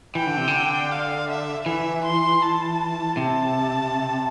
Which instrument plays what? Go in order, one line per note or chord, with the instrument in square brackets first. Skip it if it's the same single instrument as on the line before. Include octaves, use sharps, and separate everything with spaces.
[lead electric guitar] E3 [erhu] G5
[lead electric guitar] D3
C3
D3
[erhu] F5
E5
[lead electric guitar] E3 [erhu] E5
[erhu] C6
A5
[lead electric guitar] C3 [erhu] A5